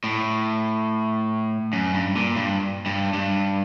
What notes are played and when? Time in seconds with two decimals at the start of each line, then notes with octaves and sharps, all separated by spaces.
0.04 A2
1.73 F#2
1.94 G2
2.16 A#2
2.36 G2
2.86 G2
3.13 G2